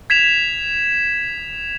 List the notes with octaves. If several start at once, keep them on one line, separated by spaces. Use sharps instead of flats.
G#6 B6 E7 F7